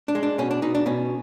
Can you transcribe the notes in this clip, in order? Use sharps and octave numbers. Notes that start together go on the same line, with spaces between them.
D4
G#3
D4
B2 C#4
D4
B2 D#4
D4
B2 C#4